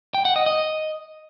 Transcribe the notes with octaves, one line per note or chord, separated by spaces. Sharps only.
G5
F#5
D#5
D#5